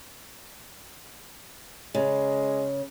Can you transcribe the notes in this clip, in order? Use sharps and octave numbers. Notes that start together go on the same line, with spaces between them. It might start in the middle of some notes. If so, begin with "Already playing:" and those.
C#3 G#3